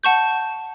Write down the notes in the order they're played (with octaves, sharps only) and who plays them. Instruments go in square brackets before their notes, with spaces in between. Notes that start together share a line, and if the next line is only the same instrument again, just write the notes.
[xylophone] F#5 A5 C#6 G6